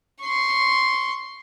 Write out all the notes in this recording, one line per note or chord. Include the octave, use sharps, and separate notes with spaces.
C6 C#6